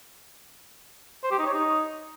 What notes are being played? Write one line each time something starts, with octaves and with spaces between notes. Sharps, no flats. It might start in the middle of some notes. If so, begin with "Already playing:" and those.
C5
G4
D#4
C#5
D#4